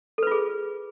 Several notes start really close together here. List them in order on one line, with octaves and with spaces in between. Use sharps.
A4 B4 F4 G#4